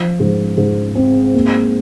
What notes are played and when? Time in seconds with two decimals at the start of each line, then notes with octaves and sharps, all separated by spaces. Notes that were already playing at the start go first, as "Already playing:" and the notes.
Already playing: F3
0.20 G#2
0.58 G#2
0.95 C4
1.34 A#3